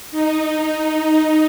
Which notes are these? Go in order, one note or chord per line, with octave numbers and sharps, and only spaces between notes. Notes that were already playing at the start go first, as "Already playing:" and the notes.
D#4
D#4
D#4